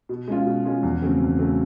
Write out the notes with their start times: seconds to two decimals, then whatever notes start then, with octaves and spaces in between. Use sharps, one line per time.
0.09 B2
0.28 G#3 C#4 F4
0.46 B2
0.65 G#3 C#4 F4
0.83 E2
1.02 C#3 F#3 A3 C4
1.20 E2
1.39 C#3 F#3 A3 C4